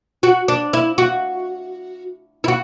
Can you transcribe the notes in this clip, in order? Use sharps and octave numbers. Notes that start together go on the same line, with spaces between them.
F#4
D4
E4
F#4
E4
F#4